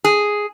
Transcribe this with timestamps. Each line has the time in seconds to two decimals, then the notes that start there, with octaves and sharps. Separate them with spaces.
0.04 G#4